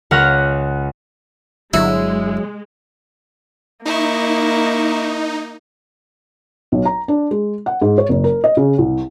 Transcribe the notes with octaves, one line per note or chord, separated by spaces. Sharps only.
C#2 C#5 F#5 F6 A#6
G1 D3 F#3 G#3 E4
A#3 D#4 E4 C#6
B1
A#5
D4
G#3
F#5
G#2
C#5
F#1
A#4
D#5
C#3
C2